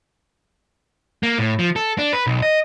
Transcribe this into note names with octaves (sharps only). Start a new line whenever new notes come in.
A#3
A2
F3
A4
D4
B4
B1
D#5